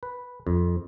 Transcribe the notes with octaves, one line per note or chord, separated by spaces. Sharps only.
B4
F2